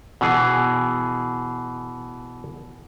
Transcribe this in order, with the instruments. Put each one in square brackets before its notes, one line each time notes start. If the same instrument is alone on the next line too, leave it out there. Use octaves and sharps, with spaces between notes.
[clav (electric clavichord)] B2 E3 G#4